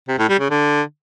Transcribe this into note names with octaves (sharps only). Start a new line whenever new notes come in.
C3
A2
G3
C#3
D3